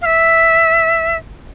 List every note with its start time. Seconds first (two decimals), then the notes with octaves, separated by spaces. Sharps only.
0.01 F5
0.06 E5